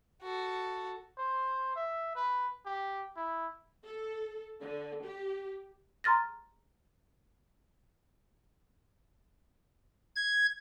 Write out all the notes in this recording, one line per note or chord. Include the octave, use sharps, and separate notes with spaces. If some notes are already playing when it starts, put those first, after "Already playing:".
F#4 A4
C5
E5
B4
G4
E4
A4
D3
G4
A#5 C6 F6 A6 A#6
G#6